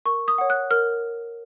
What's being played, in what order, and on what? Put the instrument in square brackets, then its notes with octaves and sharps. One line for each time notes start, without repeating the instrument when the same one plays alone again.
[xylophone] A#4 C#6
D#6
C#5 F#5
F#6
A#4 F6